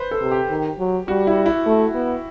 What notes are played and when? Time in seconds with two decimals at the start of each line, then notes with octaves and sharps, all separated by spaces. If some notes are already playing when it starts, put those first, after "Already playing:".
Already playing: B4 C5
0.11 A4
0.21 C3
0.31 G4
0.50 D#3
0.79 F#3
1.08 G3 F#4
1.27 E4
1.46 E4
1.66 A3
1.94 B3